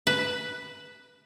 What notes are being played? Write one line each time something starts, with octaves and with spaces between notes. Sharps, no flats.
B4